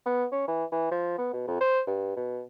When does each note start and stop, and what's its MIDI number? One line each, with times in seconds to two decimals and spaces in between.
0.06 0.25 59
0.32 0.46 61
0.48 0.64 52
0.72 0.91 52
0.91 1.17 53
1.18 1.31 59
1.33 1.45 47
1.47 1.57 41
1.61 1.81 72
1.87 2.12 43
2.17 2.42 47